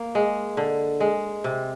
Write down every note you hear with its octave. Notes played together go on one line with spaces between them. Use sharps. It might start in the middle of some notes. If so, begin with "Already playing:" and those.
Already playing: A#3
G#3
D3
G#3
C3